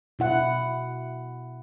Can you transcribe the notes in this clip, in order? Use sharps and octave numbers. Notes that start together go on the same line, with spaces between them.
B2 E4 F#5